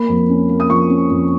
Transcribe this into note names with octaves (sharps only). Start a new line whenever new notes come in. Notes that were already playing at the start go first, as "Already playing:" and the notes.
Already playing: A#3 B5
F2
C#4
A#3
D#6
F3 C#6
C#4
F2